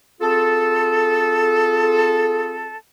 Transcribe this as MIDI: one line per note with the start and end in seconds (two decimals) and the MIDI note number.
0.21 2.76 60
0.21 2.76 65
0.21 2.76 68
0.21 2.76 69